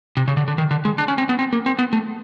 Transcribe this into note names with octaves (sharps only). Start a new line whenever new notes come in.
C3
C#3
D3
D3
D#3
D3
G#3
D4
C#4
C4
B3
C4
A#3
C4
B3
A3